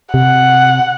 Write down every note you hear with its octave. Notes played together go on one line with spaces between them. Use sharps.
C3 F#5